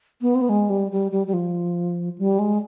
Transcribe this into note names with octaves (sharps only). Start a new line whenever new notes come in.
B3
C4
B3
G#3
G3
G3
G3
G3
F3
G3
G#3